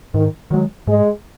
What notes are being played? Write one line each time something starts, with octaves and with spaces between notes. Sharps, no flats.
G#2 D#3
D#3 F#3 G#3
G#2 G#3